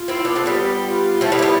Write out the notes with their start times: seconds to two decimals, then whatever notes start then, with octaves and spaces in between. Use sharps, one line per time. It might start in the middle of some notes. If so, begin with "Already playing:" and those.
Already playing: F4
0.08 C4 E4
0.25 B3 D4
0.35 A3 C4
0.46 G3 B3
0.57 G4
0.90 F4
1.21 F3 A3 E4
1.32 G3 B3
1.39 A3
1.42 G3 B3